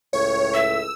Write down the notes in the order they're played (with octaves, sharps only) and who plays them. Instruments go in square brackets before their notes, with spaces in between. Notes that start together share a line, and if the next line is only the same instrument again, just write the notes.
[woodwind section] C#2 A2 [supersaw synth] C#5
[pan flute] E5 [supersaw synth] E6